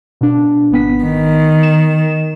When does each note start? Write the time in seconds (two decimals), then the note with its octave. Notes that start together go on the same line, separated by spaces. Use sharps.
0.21 B2 D4
0.71 G#1 B3 B6
1.03 D#3
1.63 E7